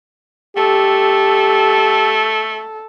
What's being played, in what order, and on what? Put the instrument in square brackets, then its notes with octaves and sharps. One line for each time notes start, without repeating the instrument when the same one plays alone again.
[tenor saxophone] A3 [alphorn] G4 [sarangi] A4